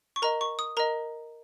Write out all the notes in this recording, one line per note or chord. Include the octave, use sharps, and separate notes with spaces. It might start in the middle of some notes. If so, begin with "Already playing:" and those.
C#6
A#4 D#5 A#5
C#6
D#6
A#4 D#5 A#5